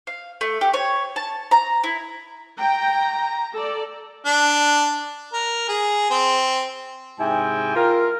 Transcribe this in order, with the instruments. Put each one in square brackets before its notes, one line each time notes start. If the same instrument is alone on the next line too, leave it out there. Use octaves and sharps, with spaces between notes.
[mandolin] F5
A3
G4
C#5
A5
A#5
E4
[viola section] G5 [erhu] A#5
[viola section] A4 D5
[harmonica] D4
A#4
G#4
C4
[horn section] G#2 C3 E4 E5 G5 G#5
F4 A#4